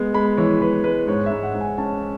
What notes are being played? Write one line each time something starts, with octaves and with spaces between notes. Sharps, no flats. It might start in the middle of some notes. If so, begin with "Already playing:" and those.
Already playing: G#3 B3
G#3 B5
E3 C#5
E3 B4
G#3 B4
G#2 C#5
G#2 E5
F#5
G#2
G#5
C#4 A5